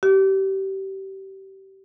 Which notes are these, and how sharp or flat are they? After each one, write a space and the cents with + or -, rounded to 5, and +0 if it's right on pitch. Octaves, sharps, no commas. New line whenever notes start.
G4 -25